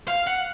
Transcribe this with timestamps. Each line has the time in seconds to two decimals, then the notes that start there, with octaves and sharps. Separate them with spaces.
0.08 F5
0.27 F#5